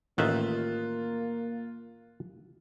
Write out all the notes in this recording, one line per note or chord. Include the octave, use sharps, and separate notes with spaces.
A1 D#3 A#3 F4 E5 F#6